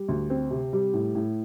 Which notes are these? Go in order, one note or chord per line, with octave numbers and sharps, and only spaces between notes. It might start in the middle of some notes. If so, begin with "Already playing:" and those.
Already playing: G3
D2
C4
C3
G3
A2
A2